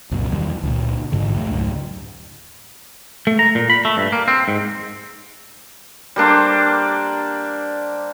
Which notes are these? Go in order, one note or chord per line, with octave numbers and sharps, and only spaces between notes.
C2 F#2 A#2
E2 D#3 G3
C#2 A#2
A1 G#2 D3
F2 A3
C#2 G#2 F#3
A3
A#5
A#2
B5
A3
G2
A#3
C4
G#2
G3 A#3 D4 C5